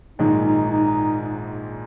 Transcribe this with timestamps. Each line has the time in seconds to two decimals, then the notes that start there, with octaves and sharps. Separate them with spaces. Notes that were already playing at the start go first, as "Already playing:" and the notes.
0.18 A#1 G#2 D#3 G#3 D#4
0.45 D#4
0.71 D#4